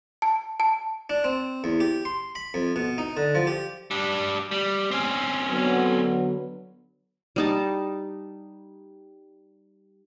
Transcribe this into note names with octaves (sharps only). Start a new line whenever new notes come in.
A5
A5
D4
C4
E2
G4
C6
B5
F2
B2
D#4
D3
F3
G4
G3 D4
G3
C4 C#4
D3 F#3 B3
G3 D#4 A5